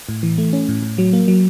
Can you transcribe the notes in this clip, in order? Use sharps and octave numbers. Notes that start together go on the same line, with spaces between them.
A2
E3
A3
C#4
A2
A2
F#3
A#3
F#3